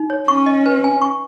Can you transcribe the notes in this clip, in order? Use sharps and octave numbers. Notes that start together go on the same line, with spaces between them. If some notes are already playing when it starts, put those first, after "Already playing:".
Already playing: D#4
C#5
C#4 C#6
D#5
B4
G#5
C#6